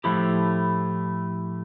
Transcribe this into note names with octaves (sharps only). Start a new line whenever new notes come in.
A2 F3 A3 E4 G4